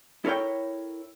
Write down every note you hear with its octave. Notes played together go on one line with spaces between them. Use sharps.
E4 A4 A#4 C#5 G5